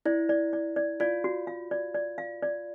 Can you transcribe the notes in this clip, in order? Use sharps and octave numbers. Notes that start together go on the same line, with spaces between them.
E4 D5
D5
D5
D5
F4 D5
F#4
F5
D5
D5
F5
D5